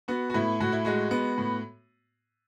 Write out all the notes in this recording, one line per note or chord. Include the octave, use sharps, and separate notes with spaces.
B3 F#4
F#4
A2 E4
A2 F#4
E4
G#3 F#4
B3
A2